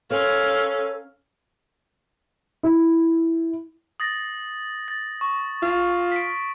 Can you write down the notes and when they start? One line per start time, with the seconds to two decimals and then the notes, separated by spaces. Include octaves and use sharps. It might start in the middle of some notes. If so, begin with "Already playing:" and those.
0.11 C#4 A4 A#4 C5 C#5 F5
2.63 E4
4.00 D#6 A6 A#6
4.88 A6
5.21 C#6
5.63 F4
6.12 B6 D7